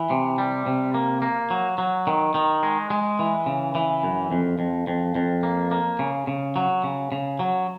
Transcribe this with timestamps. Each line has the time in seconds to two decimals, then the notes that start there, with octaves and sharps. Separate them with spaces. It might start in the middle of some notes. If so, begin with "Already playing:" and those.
Already playing: E3
0.10 C3
0.38 G3
0.66 C3
0.94 A#3
1.22 A#3
1.50 F#3
1.78 F#3
2.07 D#3
2.34 D#3
2.63 G#3
2.90 G#3
3.19 E3
3.46 C#3
3.75 E3
4.03 F#2
4.32 F2
4.59 F2
4.87 F2
5.15 F2
5.43 A#3
5.71 A#3
5.99 C#3
6.27 C#3
6.56 F#3
6.84 C#3
7.12 C#3
7.39 F#3